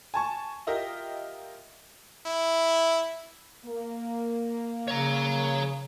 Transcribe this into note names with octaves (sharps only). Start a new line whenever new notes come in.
G#5 A5 C#6
F4 G4 A#4 D#5 E5
E4
A#3
C#3 C#5 A#5